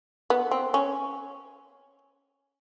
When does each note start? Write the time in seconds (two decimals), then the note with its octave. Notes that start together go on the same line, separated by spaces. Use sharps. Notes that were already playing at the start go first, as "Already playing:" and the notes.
0.30 B3
0.51 C4
0.74 C#4